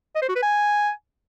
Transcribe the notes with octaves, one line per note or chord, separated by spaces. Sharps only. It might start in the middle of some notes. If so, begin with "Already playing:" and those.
D#5
C5
F#4
B4
G#5